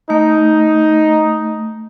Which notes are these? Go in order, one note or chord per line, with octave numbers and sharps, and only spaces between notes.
A3 D#4